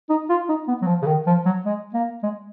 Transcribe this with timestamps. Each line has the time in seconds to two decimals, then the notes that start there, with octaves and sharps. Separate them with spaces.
0.10 D#4
0.29 F4
0.49 D#4
0.68 B3
0.82 F#3
0.88 F3
1.02 C#3
1.06 D#3
1.26 F3
1.45 F#3
1.65 G#3
1.94 A#3
2.23 G#3